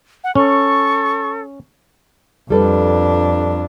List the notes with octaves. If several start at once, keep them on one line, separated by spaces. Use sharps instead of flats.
F#5
C#4 A4 C#6
F2 G3 D4 A4 B4